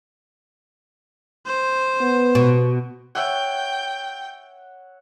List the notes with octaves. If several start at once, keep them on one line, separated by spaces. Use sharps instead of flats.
C5
B3
B2
C#5 E5 F#5 G5